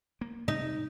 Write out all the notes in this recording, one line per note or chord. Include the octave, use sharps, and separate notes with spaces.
A#3
C3 D#4